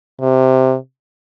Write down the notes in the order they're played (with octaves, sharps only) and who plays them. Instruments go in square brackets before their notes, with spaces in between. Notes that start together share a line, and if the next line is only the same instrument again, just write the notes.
[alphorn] C3